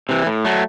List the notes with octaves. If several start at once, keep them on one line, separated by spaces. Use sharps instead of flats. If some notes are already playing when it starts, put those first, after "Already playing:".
C3 E3
A2
F#3 A3